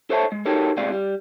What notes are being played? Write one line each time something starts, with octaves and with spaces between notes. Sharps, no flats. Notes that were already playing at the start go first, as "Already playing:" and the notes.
A4 C5 C#5 E5 A5
G#3
D#4 F#4 G4 A4 A#4 C#5
D2 A2 C3 G#3 D5 F5
G3